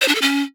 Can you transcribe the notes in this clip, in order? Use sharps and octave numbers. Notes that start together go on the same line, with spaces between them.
C5
D4
A4
C#4